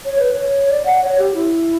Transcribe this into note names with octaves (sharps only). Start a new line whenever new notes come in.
C#5
B4
C#5
D5
F#5
C#5
G4
E4